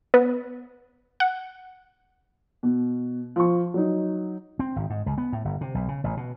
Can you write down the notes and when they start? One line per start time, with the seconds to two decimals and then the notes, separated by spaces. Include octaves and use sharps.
0.14 B3
1.20 F#5
2.63 B2
3.36 F3 C#6
3.74 F#3 D#4
4.59 C4
4.76 G#1
4.90 G#2
5.06 C#2
5.18 B3
5.32 A2
5.45 G1
5.61 C3
5.75 B1
5.88 C#3
6.04 A1
6.17 B2